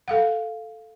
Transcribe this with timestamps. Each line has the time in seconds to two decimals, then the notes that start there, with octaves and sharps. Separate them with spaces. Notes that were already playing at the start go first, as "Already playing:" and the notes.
0.08 A4 F5 F#5